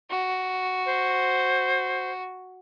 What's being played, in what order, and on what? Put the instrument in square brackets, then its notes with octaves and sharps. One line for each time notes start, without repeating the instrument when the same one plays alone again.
[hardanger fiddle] F#4
[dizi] C5